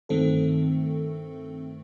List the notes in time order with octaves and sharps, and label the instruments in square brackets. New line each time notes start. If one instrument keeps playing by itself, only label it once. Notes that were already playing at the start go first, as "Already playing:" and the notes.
[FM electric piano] G2 D#3 A3 C4 A4